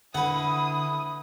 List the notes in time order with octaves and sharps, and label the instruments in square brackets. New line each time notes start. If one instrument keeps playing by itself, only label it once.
[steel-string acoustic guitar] D3 [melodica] E4 [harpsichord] B4 F#5 [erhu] D#6